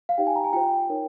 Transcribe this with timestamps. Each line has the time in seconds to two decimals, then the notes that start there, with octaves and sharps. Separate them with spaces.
0.09 F5
0.18 D#4 G4 C5 G5
0.27 G#5
0.36 A#5
0.44 G#5
0.53 F4 C5 G5
0.90 D#4 A#4 C#5